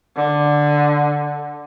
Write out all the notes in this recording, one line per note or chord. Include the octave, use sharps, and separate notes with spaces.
D3